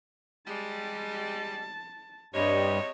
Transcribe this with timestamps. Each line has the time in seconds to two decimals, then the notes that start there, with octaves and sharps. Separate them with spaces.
0.47 G3 G#3 A5
2.34 G2 C3 G3 G#3 C#5 D#5